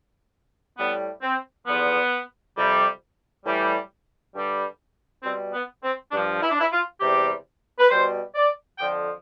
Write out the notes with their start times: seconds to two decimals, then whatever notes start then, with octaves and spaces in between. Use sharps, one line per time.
0.77 A2 G3 B3
1.22 C4
1.66 E2 D3 F3 B3
2.55 F2 C3 G3
3.45 A2 E3 G3
4.33 G2 D3 G3
5.23 B2 G3 C4
5.53 B3
5.83 C4
6.12 G2 F3 D4
6.41 E4
6.51 D4
6.60 E4
6.72 F4
7.00 E2 C3 G3 G4
7.79 B4
7.90 B2 G3 C5
8.35 D5
8.78 F2 D3 F3 G5